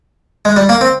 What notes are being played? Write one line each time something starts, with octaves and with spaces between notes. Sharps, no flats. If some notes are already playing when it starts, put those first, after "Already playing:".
G#3
G3
A#3
C4